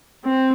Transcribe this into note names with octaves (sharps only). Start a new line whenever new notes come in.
C4